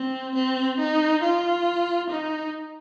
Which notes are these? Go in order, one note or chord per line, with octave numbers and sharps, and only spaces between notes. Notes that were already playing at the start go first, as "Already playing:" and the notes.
Already playing: C4
C4
D#4
F4
D#4